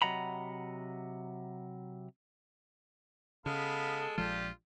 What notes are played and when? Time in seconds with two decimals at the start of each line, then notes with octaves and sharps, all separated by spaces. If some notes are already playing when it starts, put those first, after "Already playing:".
0.02 C3 F#3 D#5 F#5 A#5 B5
3.46 C#3 G#3 B3 A4 F5 B5
4.18 A#1 F3 G#3 F4 G4 D5